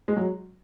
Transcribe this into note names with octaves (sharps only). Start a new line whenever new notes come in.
G#3
F#3